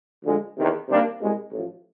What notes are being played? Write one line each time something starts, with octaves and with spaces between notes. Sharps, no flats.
D2 D3 F3 G#3
E2 C3 D#3
C3 D#3 G3 A#3 D4
C2 B2 G#3
A1 A2 F3